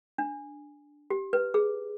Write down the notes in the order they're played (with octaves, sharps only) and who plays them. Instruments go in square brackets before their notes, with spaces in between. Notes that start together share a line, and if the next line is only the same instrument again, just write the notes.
[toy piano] D4
G4
B4
G#4